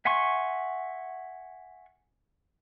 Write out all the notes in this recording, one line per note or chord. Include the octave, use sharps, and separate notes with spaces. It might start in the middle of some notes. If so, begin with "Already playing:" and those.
E5 F#5 G#5 C6 C#6